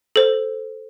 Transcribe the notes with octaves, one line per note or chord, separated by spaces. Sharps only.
A4 C5